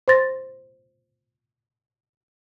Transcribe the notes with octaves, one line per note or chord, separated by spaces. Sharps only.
C5 C6 A6 A#6